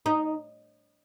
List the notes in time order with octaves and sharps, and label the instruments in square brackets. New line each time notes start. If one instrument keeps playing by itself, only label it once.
[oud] D#4